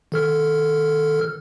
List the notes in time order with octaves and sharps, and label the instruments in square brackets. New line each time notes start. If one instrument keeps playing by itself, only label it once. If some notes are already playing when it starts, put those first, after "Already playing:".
[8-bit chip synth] D#3 A4 F6